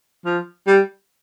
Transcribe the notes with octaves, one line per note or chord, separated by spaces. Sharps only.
F3
G3